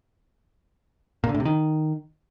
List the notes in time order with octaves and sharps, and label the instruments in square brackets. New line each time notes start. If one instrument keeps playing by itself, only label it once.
[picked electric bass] A#2
D3
A2
C3
D#3